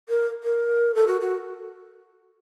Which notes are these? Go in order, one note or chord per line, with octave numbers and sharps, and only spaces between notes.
A#4
A#4
A4
F#4
F#4